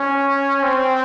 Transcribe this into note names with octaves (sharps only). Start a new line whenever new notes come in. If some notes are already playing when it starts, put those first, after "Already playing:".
Already playing: C#4
C4